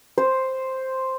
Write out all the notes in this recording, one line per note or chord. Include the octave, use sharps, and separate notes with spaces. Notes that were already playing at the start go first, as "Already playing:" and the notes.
C5